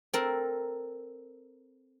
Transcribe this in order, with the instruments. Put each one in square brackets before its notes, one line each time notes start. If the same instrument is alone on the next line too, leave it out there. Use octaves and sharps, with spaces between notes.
[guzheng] C4 A4 A#4